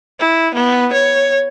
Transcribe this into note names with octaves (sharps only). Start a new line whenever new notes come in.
E4
B3
C#5